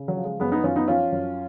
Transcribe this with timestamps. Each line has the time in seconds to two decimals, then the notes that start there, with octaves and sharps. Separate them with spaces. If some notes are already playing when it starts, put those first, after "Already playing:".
Already playing: C#3
0.08 F#3
0.17 F3
0.24 G#3
0.40 F#2 G#3 B3
0.52 B3 D#4
0.64 F#2 C#4 F4
0.76 B3 D#4
0.88 F3 C#4 F4
1.12 F#2